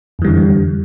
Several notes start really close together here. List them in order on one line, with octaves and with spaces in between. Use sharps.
F2 E3 G3 D3